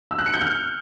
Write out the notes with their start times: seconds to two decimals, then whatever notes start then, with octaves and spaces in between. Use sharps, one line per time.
0.11 E6
0.18 F#6
0.26 C#7
0.34 G6
0.41 F6